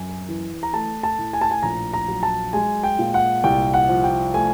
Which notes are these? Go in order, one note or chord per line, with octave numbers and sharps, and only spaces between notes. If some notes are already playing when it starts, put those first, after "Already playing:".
Already playing: F#2 G#5
E3
A#5
A3 A5
A5
A2
G#5
A5
G#5
A#1 A#5
A#5
F#3
A5
G#3 G#5
G5
A#2
F#5
C2 G5
F#5
F3
G5
A3 G#5